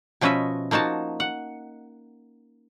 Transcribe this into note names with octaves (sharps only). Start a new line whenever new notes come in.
B2 F3 C#4 B4 D#5 E5
F3 A#3 D#4 F#4 A5
F#5